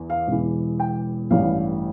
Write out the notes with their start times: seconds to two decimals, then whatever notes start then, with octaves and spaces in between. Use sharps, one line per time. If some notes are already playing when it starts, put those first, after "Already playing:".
Already playing: E2 E3
0.10 F5
0.28 E1 E2 E3
0.80 G5
1.31 A1 G2 E3 F5